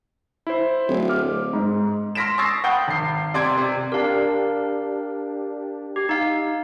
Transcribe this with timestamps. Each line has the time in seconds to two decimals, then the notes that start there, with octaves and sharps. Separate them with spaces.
0.47 E4 C5
0.88 D1
1.09 D6 F6
1.53 G#2
2.15 C6 F6 A#6 B6 D7 E7
2.38 C#6 D#6 E6 A6 A#6 C7
2.64 F#5 G5 B5 D#6 G6
2.88 G#1 C7
3.34 C3 D5 C6 G#6 D7
3.58 C3
3.92 D4 G4 A#4 F5
5.96 G4
6.09 D#4 F5